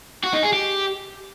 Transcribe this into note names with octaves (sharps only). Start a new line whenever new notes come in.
F#4
D#4
G#4
G4